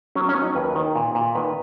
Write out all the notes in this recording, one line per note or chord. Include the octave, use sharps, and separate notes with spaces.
F#3 C#4
C#4
F#3
D#4
D#2 B4
D#3
A#2
A#2
D#3 B4